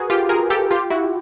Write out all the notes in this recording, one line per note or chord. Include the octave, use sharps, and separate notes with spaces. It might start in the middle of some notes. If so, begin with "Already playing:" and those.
Already playing: F#4 G#4 A#4 B4
F4 G4
G#4 A#4
G4 A4
F4 G4
E4 F#4